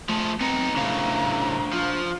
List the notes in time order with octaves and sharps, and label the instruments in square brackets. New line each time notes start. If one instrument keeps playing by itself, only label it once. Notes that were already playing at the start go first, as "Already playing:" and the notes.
[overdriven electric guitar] F3 G#4 [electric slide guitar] A3 [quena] A5
[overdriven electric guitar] B3 D#4 [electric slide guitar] C4 [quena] A#5
[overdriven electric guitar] A2 C#3 [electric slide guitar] D4 C5 F5
[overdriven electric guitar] F3 [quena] F4